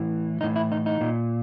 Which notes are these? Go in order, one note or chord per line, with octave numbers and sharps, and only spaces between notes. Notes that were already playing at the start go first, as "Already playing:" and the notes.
Already playing: A2 E3
A2 E3 D#4
E4
D#4
D#4
A#2